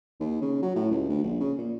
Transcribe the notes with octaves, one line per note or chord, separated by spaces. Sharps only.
D#2
C#3
F#3
A2
C#2
D2
A#1
C#3
A#2